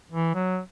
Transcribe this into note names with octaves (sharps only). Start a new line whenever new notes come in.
E3
F#3